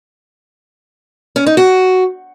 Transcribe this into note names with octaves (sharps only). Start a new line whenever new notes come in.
C#4
D#4
F#4